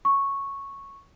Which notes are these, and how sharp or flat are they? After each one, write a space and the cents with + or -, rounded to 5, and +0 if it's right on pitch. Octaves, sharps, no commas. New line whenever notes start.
C#6 -5